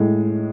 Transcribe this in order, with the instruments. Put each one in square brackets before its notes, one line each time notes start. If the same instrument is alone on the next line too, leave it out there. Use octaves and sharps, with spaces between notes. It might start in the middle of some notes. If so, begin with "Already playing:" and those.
Already playing: [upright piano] A2 G#3